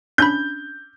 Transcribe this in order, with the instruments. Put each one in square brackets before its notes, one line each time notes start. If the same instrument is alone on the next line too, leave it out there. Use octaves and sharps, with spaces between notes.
[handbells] C#4 D4 B5 [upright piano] G6